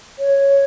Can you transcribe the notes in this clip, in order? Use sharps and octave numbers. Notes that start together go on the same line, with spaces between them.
C#5